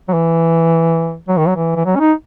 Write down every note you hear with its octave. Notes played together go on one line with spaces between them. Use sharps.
F#3
E3
F#3
D#3
F#3
E3
E3
F#3
C#4
D#4